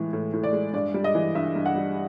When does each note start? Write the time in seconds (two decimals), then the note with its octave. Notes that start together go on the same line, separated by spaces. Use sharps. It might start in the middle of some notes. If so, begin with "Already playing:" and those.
Already playing: A2 E3 G#3
0.13 A2
0.33 A2
0.43 D5
0.53 G#3
0.73 G2 D5
0.94 G3
1.04 D#5
1.15 E3
1.35 G2 E5
1.56 G2
1.66 F#5
1.75 G3